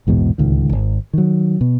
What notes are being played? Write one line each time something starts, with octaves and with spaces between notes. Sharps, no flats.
A#1 E2 G#2 B2
D1 G#1 C#2 D#3
G#1
D#3 F#3
B2